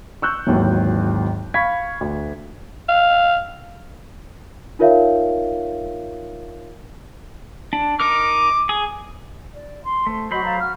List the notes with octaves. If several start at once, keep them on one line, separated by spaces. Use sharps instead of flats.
C#6 E6 F#6 G6
G#1 D#2 G#2 E3 F#3
F5 B5 C#6 G#6 B6
D2
F5
D#4 F4 A#4 C#5 E5 F5
D4
D#4 A#4 D6 F6
G#4
D5
C6
A3 C5
F#3 F#4 C5 D#5 B5
A4 F5 A#5
F#4 F6